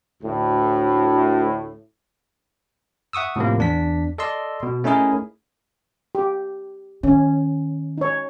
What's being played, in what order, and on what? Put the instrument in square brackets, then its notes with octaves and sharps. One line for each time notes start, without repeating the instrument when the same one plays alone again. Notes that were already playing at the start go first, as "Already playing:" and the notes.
[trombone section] D2 A2
[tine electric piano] E5 F#5 C#6 D#6 E6
A2 C3 F3 A#3
E2 D4 B6
A4 D5 D#5 C6 E6
B2
A3 C#4 D#4 E4 G#4 A#4
[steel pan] G4
[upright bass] D#3 [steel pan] C#4
[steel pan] D#4 C#5